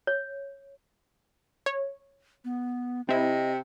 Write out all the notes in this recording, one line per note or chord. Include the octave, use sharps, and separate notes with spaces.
C#5
C#5
B3
C3 C4 E4 D#5